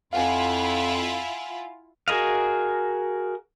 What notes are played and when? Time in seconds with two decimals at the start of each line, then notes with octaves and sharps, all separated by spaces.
0.13 F2 E4 F4 F5 F#5 G#5
2.08 F#4 G#4 A#4 D#5 F5